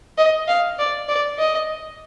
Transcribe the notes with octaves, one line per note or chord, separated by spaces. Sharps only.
D#5
F5
D5
D5
D#5